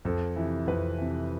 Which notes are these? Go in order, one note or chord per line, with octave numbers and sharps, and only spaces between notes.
F2 A4
C3 E3
F2 B4
C3 E3